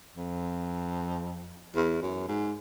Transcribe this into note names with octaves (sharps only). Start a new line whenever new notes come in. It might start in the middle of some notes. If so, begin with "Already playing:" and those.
F2
E2
F#2
G#2